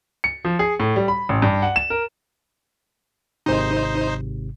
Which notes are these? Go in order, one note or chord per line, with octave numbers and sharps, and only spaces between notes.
C#7
F3
G#4
A2
G3
B5
A1
G2
F#5
E7
A#4
G#1 G#2 C3 D#4 C5